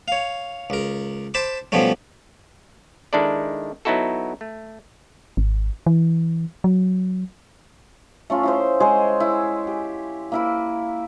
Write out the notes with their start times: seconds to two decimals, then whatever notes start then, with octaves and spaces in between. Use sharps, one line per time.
0.08 C#5 F5
0.70 C#2 A#4
1.34 C5 A5 B5 D6
1.72 B2 F3 G3 A3 C#4
3.13 D#3 G#3 D4 E4 A4 D5
3.85 F#3 B3 D#4 E4 F#4 A4
4.41 A3
5.37 G#1
5.86 E3
6.64 F#3
8.30 A3 C#4 F4
8.43 E4 G#4 C5
8.80 G#3 G#4 C5 C#5
9.20 E4
9.67 G4
10.32 A#3 E4 B5